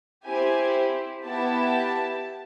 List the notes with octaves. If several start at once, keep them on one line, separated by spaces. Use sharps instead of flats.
C4 E4 G4 G#5
B3 E4 G4 A5